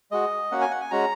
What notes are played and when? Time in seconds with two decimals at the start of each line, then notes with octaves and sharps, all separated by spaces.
0.11 G#3 F#4 D#5
0.51 A#3 C#4 F#4 F#5
0.62 G#5
0.71 F#5
0.81 G#5
0.91 G#3 C#4 F#4 A#5